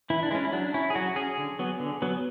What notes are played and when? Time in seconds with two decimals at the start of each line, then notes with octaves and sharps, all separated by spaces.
0.10 E3 E4
0.23 D4
0.31 G#3 C#4 E4
0.45 E4
0.52 F#3 D4
0.74 C#4 E4
0.90 G#4
0.95 F#3 F#4
1.16 C#4 G#4
1.38 D3
1.59 F#3 B3
1.80 D3
2.02 F#3 B3